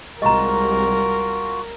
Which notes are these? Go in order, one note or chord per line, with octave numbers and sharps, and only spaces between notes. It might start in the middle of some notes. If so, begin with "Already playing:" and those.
C2 G3 G#3 F4 F#4 A#4 D#5 A#5